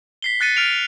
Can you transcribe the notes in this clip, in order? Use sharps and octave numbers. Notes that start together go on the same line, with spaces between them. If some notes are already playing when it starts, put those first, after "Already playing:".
B6 C7 G7
F#6 A6 C#7 D#7
F6 D7 F7